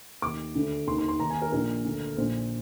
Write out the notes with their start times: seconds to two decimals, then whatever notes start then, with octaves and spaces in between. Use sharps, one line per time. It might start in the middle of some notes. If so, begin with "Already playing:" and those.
0.22 D#2 D#3 D6
0.55 D2 D3
0.87 D#2 C6
0.92 D#3
0.98 C6
1.08 C6
1.20 D#2 D#3 A#5
1.30 G#5
1.42 A#4
1.52 A#1 A#2 A#4
1.85 D2 D3
2.17 A#1 A#2 C5